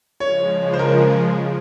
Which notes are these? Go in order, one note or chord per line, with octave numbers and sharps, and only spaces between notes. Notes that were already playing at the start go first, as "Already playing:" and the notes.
C#3 F3 G#3 C#5
C5
A#4